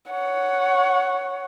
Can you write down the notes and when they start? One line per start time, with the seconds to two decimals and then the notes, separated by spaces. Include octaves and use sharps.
0.11 C#5 F#5